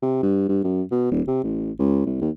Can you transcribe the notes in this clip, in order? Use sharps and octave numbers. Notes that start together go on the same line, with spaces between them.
C3
G2
G2
F#2
B2
D#1
C3
A1
C#2
C2
D#2